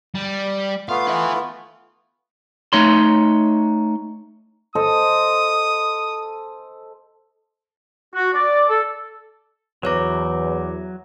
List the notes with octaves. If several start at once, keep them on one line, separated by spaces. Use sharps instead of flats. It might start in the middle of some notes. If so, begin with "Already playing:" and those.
G3
A3 B3 F4 F5
B4 E5
A3 D#4 C#5 C6
A4 C5 D#5 D#6
F#4
D5
A4
E2 F#3 F#4 B4 C#5 A#5 D6